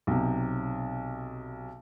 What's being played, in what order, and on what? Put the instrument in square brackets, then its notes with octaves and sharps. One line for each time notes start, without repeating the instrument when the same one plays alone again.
[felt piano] B1 C3